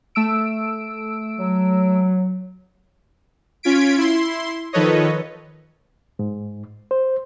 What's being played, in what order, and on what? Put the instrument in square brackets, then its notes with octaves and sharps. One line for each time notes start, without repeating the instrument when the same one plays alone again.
[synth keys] A3 E6 D7
[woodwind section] F#3
[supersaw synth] C#4 F4 G#6 B6 D7
E4 C6
D#3 F3 A4 B4 C#5 D#5
[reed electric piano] G#2
C5